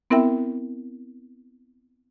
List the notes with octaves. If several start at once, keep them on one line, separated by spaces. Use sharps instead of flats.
B3 C4 E4 A#4 E5 G5